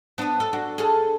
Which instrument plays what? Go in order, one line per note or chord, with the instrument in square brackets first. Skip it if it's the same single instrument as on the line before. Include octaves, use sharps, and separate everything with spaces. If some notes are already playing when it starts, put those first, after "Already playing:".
[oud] B3 D4 [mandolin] A5 D#6
[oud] A4
D4 F#4
[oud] G#4 A4 [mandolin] A5 F6